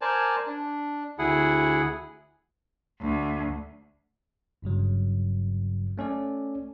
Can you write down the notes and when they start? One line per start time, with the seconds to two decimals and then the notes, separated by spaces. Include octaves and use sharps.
0.01 A#4 C5 D5 G#5 A5
0.47 D4
1.19 D2 E4 G#4 F#5
3.01 D2
4.62 G1 G2 C#3 F#3
5.98 A3 C#4 A4 D5